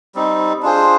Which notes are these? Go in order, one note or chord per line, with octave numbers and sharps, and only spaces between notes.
G3 C4 D#4
D4 F4 G#4 C5